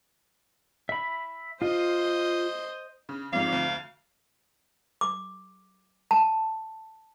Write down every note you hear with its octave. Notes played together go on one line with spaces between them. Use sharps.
E5 B5
F4 C5 D#5
C#3
G#1 F2 G#2 F5
D2
D6
A5